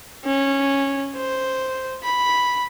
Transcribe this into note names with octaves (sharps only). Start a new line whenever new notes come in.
C#4
C5
B5